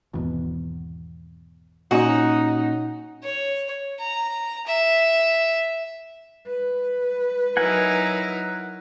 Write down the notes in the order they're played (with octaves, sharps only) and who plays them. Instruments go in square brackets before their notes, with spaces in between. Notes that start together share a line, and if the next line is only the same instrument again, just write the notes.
[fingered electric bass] G#1 E2 B2
[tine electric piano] A#2 C#4 [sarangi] D#4 [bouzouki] F#4
[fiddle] C#5
A#5
E5
[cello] B4
[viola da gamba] F#3 D#4 E4 [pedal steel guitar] A#4 F#5 G#5